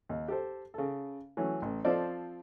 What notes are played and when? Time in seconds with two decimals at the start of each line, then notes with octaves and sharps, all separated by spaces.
0.09 D#2
0.28 G4 A4 C5
0.74 C#3 A4
1.37 E3 F#3 A3 C#4
1.62 A1
1.84 F3 C4 A4 C5 D5 D#5